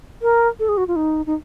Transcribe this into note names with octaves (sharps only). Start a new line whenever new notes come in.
A#4
A4
G#4
F#4
F4
D#4
D#4